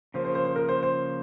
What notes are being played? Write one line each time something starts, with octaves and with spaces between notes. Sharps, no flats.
C#3 F3 A#3 C5
C5
C5
C5
A#4
C5
C5